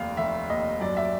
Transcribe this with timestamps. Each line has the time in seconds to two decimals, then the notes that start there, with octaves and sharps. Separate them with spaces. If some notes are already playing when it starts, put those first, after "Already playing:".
Already playing: F1 D#2 F5
0.17 F1 E5
0.50 D#2 D#5
0.80 F#2 D5
0.97 E5
1.05 D5